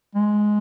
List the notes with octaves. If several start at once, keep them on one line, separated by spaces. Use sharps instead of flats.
G#3